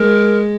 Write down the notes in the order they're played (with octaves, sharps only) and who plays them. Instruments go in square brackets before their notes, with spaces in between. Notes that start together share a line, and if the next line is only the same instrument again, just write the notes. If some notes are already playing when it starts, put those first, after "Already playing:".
Already playing: [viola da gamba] G#3 [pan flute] A#4